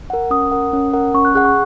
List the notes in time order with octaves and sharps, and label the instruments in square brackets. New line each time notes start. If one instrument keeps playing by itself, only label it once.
[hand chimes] A#4 F#5
[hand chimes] C#4 [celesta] D#6
[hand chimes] A#4 F#5
C#4
A#4 F#5
[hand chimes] C#4 [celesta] C#6
[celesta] F#6
[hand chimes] G#4 F#5 [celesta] F#6
[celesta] C#6